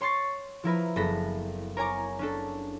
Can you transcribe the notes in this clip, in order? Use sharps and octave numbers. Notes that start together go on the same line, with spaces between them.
C#5 C6 C#6 A6 C7
F3 E4 A#4 B4
F#1 B3 A4 A#6 B6
A#4 C#5 G#5 A#5 D6
C#4 D4 A4